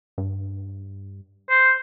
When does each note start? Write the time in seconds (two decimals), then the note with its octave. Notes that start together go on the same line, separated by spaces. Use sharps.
0.18 G2
1.50 C5